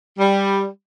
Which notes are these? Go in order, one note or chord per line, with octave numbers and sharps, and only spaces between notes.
G3